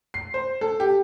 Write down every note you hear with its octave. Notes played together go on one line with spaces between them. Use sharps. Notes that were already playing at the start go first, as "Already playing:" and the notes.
C7
C5
A4
G4